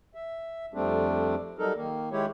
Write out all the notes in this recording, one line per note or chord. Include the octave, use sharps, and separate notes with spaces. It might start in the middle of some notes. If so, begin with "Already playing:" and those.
E5
F2 G3 A3 C4 D4
F#3 G3 D#4 A4 A#4
D#3 A#3
D#3 G#3 E4 G4 C#5